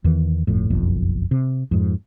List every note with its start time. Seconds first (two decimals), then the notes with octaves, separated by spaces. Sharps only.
0.04 E2 D#3 E3
0.47 G1 F2 A2
0.70 F#1 B1 F2
1.31 C3
1.71 F2 G#2